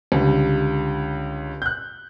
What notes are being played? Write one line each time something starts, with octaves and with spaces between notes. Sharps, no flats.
C#2 D3 G3
F#6 G6